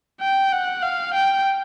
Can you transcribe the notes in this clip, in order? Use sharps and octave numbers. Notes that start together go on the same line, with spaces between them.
G5
F#5
F5
G5